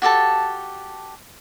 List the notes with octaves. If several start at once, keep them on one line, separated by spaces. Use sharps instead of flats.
F#4 G4 A4 A5